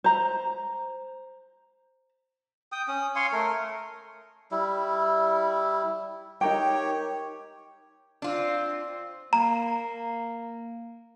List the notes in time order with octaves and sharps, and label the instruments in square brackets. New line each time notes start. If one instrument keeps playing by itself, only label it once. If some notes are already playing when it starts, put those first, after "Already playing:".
[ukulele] C5 A#5
[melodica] G5 D#6
C#4 D#6
C#5 F5 G#5 C6
A3 A#4
G3 E4
[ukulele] D#4 A#4 G5 [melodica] G4 C#5
[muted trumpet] C4 [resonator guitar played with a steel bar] D4 F4
[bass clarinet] A#3 [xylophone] A#5